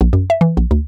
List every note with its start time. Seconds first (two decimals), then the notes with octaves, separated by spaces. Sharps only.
0.01 A#1
0.13 F#2
0.30 E5
0.41 E3
0.57 A#1
0.71 D2